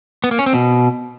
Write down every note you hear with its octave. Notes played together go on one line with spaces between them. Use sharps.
B3
A#3
C#4
C4
B2